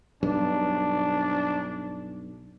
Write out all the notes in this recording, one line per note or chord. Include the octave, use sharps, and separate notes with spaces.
B1 G2 D4